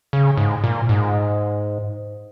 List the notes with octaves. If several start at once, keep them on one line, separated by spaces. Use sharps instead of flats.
C#3
G#2
A#2
G#2